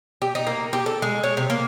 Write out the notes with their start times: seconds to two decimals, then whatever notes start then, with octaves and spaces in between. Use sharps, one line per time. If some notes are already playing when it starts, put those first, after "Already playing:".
0.22 G4
0.35 D#4
0.47 A#3
0.73 G4
0.86 A4
1.02 G#3
1.23 C#5
1.37 C3
1.50 A#3